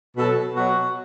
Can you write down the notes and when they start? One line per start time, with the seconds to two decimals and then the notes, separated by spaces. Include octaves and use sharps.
0.17 B2 F#3 A4
0.55 B2 F#3 F#4